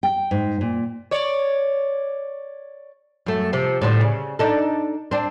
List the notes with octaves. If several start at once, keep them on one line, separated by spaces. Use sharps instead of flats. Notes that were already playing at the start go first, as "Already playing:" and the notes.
G5
G#2
A#2
C#5 D5
F#2 A3
C3 F3
A2 D3 C5
C#3
D4 D#4 A4
C4 D4